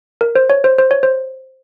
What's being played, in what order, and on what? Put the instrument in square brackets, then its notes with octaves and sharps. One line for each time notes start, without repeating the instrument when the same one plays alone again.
[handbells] A#4
C5
C#5
C5
C5
C#5
C5